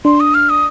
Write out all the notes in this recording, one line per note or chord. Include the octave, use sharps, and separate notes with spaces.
D4 C6
D#6
F6
D#6